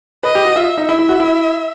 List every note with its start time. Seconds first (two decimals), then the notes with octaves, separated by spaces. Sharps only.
0.23 B4 D#5
0.35 G4
0.45 F#4
0.56 F4 E5
0.78 D#4
0.88 E4 E5
0.99 E4
1.09 F#4
1.20 E4